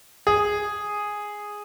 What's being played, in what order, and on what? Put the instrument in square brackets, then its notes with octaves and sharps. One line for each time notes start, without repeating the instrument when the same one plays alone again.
[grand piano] G#4